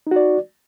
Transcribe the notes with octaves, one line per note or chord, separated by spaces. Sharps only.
D#4 F#4 D5